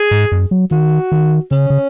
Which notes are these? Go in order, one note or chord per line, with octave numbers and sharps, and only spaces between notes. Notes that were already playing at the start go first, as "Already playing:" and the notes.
Already playing: G#4
G#2
F#2
F#3
D#3 F#4
D#3
C#3 C#4
C#3